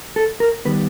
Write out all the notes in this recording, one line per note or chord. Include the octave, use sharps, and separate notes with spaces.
A4
A#4
D#3 G3 B3 B4